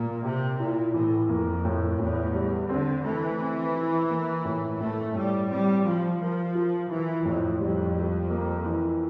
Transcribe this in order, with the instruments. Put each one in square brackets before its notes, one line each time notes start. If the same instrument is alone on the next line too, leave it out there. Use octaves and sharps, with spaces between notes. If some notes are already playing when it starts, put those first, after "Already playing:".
Already playing: [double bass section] A#2 [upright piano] A#3
[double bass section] C3 [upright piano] G4
[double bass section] A#2 [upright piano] E4
[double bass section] A2 [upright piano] E3
[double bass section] F2 [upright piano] A#3
[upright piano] A2
[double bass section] E2 [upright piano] A2
[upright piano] G3
[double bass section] D3 [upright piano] C4
[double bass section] E3 [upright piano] A3
[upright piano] C4
E4
A#3
A2
[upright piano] A2 [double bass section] A3
[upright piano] A2 [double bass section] G3
[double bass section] G3 [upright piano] C4
[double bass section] F3 [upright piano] F4
[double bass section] F3 [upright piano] A#4
[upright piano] F4
[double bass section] E3 [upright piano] E4
[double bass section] F2 [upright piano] A2
[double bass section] F2 [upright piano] G3
[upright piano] G3
A#3
E3